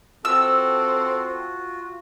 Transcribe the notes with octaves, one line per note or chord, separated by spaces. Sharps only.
C4 F4 F#4 A4 E6